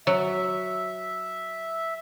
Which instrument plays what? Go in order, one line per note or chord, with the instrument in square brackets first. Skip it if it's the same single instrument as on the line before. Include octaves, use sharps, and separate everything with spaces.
[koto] F#3 [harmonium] E5